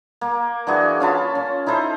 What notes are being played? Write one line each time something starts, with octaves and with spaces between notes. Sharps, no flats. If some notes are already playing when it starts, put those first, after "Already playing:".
A#3
E3 D4 F#4 G#4
C#4 F4 A5 B5
C#4
D#4 E4 A4 C5